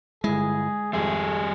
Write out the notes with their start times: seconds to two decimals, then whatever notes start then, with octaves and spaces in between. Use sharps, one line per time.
0.24 G1 G#3 E4 G#4
0.93 G#1 F2 G3 A3 G#4 E5